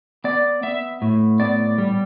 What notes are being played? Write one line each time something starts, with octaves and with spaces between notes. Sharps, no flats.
B3 D5
B3 E5
A2
B3 D5
G3